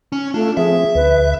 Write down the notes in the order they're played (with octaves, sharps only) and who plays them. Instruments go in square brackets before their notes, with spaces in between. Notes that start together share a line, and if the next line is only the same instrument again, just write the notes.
[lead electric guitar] C#4
[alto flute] A3 [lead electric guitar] D4 [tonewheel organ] F4
[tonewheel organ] F3 C4 [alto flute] G#4 [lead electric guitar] E5
[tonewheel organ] D2 [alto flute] B4